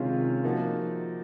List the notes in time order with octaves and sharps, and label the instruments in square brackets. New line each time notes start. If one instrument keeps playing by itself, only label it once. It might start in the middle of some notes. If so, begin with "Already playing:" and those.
Already playing: [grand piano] C3 D#3 G#3 C#4 F4
F3 A#3 D#4 F#4